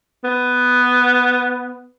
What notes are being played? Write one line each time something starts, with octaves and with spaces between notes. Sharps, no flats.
B3